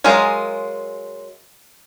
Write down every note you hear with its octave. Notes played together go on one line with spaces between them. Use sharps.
F#3 G#3 F4 G#4 A#4